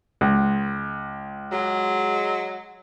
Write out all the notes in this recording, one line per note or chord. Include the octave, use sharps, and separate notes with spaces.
C#2
F#3 G#3